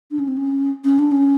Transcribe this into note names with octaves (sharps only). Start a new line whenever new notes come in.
D4
C#4
C4
C#4
C#4
D4
C#4